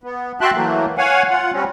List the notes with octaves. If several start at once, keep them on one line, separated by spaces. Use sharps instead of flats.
B3
F#4 E5 G5 A5 C6 F#6
E3 F#3 A3 A#3
C#5 F5 F#5 G#5
F4 F#5
G3 C4 C#4